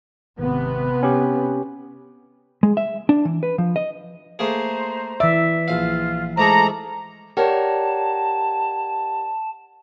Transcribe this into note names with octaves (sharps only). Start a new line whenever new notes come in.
G#1 C3 B3
C#4 G4
G#3
E5
D4
E3
B4
F3
D#5
A3 A#3 G#4 C5 A#5
E3 D5 E5
A#1 F4 F5
G#2 A3 G#4 A4 A#5 D6
G4 A#4 C#5 D5 F#5 G5 A5